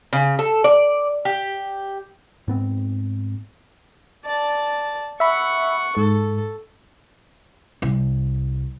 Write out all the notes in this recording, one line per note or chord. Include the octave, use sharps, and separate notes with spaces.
C#3
A4
D5
G4
G#2 B3 C4
D5 A5
E5 F#5 B5 C#6
G#2 A4
C2